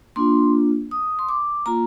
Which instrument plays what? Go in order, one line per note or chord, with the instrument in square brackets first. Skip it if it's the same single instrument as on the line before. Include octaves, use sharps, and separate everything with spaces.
[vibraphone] A#3 D4 F4 C6
D#6
C6
D6
A#3 F4 A#5